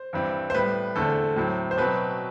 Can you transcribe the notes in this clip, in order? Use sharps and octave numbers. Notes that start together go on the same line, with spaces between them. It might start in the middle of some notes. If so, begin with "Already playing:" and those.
Already playing: C5
G2 E3 G3 C4
C5
A2 G3 B3 B4
E2 D3 A3 C4 A4
A2 F#3 C4
C5
B2 F#3 C4 B4